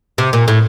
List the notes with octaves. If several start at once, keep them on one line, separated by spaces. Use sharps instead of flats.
C3
A#2
A2